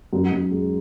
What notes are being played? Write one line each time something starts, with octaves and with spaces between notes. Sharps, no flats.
F#2
F#2
G#3